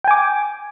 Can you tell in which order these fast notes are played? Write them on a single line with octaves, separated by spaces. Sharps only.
G5 G#5 D6